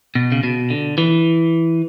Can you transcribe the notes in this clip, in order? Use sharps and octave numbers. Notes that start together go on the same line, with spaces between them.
B2
C#3
B2
D3
E3